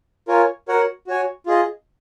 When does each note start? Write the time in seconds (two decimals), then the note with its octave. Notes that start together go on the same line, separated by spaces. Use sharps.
0.28 F4 A#4 C#5 G#5
0.68 F#4 A#4 C#5 F#5
1.07 F#4 C#5 G#5
1.46 F4 G#4 D#5